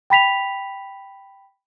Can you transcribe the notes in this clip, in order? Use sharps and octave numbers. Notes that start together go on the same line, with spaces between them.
G5 B5 B6 F7